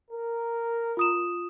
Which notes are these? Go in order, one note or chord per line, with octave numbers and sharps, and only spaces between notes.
A#4
F4 D#6 E7